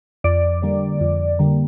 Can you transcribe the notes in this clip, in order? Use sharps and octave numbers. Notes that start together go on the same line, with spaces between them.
F2 D5
D3 G3 A#3
F2
D3 G3 A#3